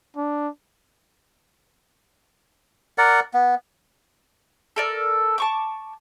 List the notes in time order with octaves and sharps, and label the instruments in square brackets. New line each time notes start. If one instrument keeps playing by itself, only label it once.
[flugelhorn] D4
[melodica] A#4 D5 F#5
B3
[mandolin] A4 A#4 D5
A5 C#6 D6